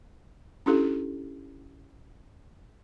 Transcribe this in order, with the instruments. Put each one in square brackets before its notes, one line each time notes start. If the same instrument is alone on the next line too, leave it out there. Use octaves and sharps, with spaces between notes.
[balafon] C#4 D4 E4 G4 A4